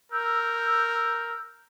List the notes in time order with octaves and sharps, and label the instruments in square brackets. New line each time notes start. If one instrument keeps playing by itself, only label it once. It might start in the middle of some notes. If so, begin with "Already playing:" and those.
[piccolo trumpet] A#4 [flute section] E6 G6